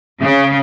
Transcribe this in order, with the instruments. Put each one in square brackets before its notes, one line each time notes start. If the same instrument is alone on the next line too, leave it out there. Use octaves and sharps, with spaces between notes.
[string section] C#3